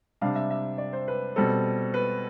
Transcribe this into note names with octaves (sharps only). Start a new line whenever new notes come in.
C3 G3 D4 F5
E5
E5
D5
C5
B4
B2 G3 C4 A4
B4